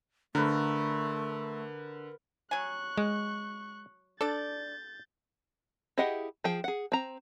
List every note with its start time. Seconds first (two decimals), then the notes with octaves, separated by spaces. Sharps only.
0.35 D3 A3 A#4 B4
2.51 F#3 G#5 C#6 F#6
2.98 G#3
4.21 D4 A4 D5 G6 A6
5.98 E4 G4 G#4 D#5 F#5
6.44 F3 G#4 G5
6.64 G#4 F#5
6.92 C4 A#5